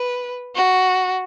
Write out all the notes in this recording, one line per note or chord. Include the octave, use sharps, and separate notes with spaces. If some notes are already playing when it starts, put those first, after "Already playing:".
Already playing: B4
F#4